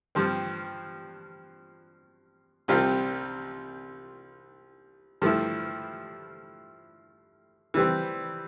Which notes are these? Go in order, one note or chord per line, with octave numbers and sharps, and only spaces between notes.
G2 F3 C4
C2 C3 G3 C4 F4
G2 F3 A3 E4
E3 G3 C4